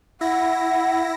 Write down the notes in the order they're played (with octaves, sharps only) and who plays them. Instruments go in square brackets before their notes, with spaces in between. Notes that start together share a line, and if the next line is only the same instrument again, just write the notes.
[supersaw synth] E4 A#6 [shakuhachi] F#5